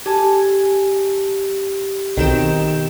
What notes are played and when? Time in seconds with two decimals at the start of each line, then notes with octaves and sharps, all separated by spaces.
0.06 G4 A4 G#5
2.17 B1 D#3 C4 G5 G6 E7